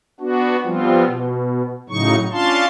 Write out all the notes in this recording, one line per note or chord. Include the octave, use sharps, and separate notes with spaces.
B3 D4 F#4
F3 G3 B3 C4 F4
B2
A2 C#3 F#3 D#4 C#6
C#4 D4 F4 F5 A5 C6